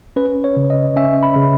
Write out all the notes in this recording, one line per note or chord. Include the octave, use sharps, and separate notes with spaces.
C#4 B4
C#5
C#3
D#5
C#4 E5
B5
C#3